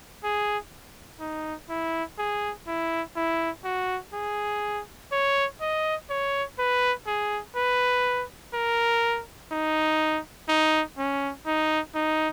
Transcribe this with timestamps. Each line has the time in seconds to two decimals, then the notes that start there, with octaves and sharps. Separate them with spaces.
0.24 G#4
1.20 D#4
1.70 E4
2.18 G#4
2.68 E4
3.16 E4
3.64 F#4
4.13 G#4
5.12 C#5
5.61 D#5
6.10 C#5
6.59 B4
7.07 G#4
7.56 B4
8.54 A#4
9.52 D#4
10.48 D#4
10.98 C#4
11.46 D#4
11.95 D#4